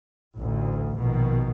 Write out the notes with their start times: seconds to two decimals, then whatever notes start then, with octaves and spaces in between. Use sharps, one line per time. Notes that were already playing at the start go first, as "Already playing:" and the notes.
0.36 A1 D2
0.98 A#1 B2 D#3